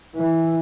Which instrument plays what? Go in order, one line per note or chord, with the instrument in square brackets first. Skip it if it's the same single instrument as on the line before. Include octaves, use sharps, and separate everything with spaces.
[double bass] E3